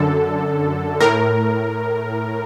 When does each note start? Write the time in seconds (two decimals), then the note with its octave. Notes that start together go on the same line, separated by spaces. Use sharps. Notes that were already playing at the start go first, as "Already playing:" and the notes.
Already playing: F#2 D3 A4
1.00 A2 A#4